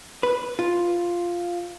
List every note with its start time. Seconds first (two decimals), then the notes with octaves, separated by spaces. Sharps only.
0.23 B4
0.59 F4